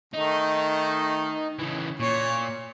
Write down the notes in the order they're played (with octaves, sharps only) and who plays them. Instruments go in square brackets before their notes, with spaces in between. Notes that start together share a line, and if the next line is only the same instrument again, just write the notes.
[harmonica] D#3 A3 [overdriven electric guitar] D#4
[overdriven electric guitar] C#3 E3
[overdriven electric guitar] A#2 [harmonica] C#5